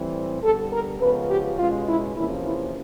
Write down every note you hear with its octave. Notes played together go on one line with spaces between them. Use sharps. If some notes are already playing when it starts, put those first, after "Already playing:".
Already playing: A2 E3 G3 C4
D3 G3 B3 A4
A#4
C#3 F3 G#3 B3 B4
G4
B2 G#3 C#4 F4
E4
E2 C3 F3 A#3 C#4 E4
E4